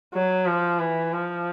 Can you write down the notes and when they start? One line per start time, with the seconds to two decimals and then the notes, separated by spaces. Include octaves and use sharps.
0.14 F#3
0.46 F3
0.79 E3
1.12 F3